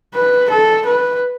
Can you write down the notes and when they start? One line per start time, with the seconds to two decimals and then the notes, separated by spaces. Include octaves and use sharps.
0.14 B4
0.50 A4
0.86 B4